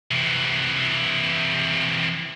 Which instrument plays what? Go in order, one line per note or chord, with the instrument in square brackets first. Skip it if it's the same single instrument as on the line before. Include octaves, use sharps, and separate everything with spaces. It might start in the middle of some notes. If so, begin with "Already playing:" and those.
[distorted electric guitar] C3 E3